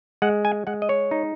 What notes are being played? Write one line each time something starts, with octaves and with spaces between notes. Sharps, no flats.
G#3 F#5
G#5
G#3 F#5
D#5
C#5
D#4